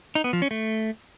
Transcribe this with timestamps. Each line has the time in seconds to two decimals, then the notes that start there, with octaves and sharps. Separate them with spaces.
0.15 D#4
0.24 B3
0.33 F3
0.42 C#4
0.51 A3